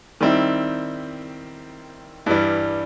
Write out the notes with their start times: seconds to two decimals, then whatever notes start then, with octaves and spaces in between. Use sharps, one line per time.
0.21 D#3 G3 C4 E4
2.26 G2 E3 G3